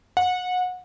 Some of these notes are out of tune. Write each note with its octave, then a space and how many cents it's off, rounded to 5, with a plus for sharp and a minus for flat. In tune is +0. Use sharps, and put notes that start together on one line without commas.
F#5 -25